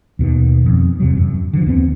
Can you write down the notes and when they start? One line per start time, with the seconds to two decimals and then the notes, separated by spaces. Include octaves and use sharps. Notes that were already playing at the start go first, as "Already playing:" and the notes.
0.19 D#2 B2 D#3
0.66 F2
1.00 E2 C3 F#3
1.17 F#2
1.53 D3 F3
1.66 D#2 B3 C4